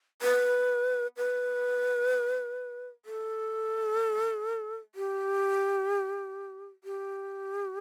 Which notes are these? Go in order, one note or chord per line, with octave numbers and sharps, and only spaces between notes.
B4
B4
A4
G4
G4